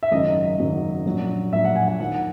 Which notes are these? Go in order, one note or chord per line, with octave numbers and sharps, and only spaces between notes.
E5
G#1 F#2 C#3 F#3 D#5
G#1 F#2 C#3 F#3
A#1 A#2 F#3
A#1 A#2 F#3 E5
F#5
G#5
F#5
D#2 D#3 F#3 F#5